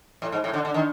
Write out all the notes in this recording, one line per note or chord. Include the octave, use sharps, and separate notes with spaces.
A2
G#2
A2
D3
D3
D#3